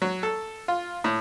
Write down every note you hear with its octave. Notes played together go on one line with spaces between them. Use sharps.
F#3
A4
F4
A2